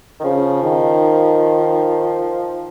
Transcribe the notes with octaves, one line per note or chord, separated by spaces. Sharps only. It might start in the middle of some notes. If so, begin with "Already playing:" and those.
D#3
C#3 F3
D#3